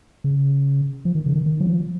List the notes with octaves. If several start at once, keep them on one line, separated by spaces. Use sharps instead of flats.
C#3
F3
D#3
C#3
D#3
D#3
F#3
F3